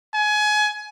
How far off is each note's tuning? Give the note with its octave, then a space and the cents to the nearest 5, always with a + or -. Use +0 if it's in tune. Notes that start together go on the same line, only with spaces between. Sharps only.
G#5 +25